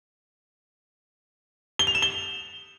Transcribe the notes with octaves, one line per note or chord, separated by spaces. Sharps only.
G7
F7
E7
G7